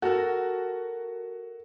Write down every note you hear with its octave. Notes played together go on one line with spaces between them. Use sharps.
F#4 A4 A#4